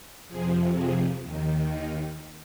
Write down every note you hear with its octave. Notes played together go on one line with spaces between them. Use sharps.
F2 C3 F3 G#4
G#4
D#2 D#3
D#4